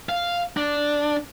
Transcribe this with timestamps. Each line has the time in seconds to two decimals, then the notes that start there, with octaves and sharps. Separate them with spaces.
0.09 F5
0.57 D4